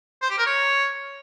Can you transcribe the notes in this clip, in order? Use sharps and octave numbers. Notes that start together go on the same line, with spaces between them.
C5
G4
A#4
C#5